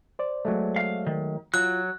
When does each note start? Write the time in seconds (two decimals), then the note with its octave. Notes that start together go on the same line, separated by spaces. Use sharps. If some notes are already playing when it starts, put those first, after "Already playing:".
0.19 C5 D5
0.45 F#3 G#3 A3
0.76 F5
1.07 D#3
1.54 F#3 F4 F#6